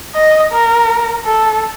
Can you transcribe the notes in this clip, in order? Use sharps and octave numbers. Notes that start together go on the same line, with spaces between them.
D#5
A#4
A4